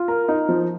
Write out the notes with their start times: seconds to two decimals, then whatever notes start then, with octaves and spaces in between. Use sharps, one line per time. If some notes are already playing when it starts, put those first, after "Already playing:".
Already playing: F4
0.08 A#4
0.28 D#4
0.49 F3